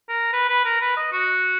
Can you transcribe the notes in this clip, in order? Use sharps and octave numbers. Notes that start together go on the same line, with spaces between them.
A#4
B4
B4
A#4
B4
D#5
F#4